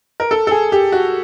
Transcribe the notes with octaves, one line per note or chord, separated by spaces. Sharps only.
A#4
A4
A4
G#4
G4
F#4